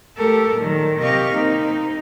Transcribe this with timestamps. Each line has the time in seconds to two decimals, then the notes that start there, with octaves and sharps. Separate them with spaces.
0.16 A3 G4 A4 A#4
0.55 A#2 D#3 F#3
0.98 C3 G4 D#5 F5 C#6
1.32 A#3 C4 D#4